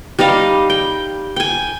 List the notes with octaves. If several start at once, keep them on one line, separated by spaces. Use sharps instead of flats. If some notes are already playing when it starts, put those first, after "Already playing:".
G3 D#4 D#5 F5
G5
G5 G#5